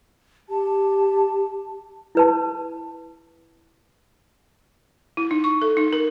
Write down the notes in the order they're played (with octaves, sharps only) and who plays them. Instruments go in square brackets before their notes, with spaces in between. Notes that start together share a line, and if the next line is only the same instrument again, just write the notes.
[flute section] G4 A5
[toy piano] E4 B4 A5
[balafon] E4
D#4
C#6
A4
D#4
A#4